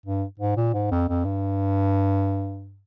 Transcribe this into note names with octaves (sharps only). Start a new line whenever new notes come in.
G2
G#2
A#2
G#2
F2
F2
G2